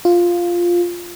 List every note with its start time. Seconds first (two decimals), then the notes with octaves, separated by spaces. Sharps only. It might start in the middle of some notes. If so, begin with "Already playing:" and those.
0.05 F4